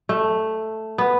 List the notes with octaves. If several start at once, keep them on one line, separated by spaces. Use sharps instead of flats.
A3
B3